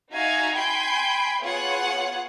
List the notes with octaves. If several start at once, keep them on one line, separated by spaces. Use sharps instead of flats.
D#4 F#4 E5 F5 G#5 A#5
G5 G#5 B5 C6 G6
B3 F4 G#4 C#5 F#5